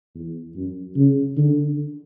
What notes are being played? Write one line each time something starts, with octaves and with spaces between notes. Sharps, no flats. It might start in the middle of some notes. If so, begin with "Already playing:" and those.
E2
F#2
C#3
D3